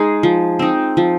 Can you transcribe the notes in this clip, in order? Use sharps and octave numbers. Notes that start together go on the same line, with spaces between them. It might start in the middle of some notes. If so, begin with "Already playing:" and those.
Already playing: G#3 D#4 G#4
F3
C4 D#4
F3